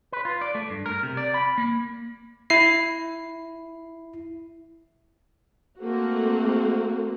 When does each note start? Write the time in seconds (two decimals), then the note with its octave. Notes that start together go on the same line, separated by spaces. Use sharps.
0.12 B4
0.25 F4
0.41 D5
0.55 A3
0.70 G2
0.86 A#4
1.03 C3
1.17 D5
1.34 B5
1.58 A#3
2.50 E4 C7
5.81 A3 A#3 C4 F#4